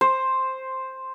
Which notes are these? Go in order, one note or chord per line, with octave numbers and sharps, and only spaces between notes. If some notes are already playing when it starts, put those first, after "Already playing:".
C5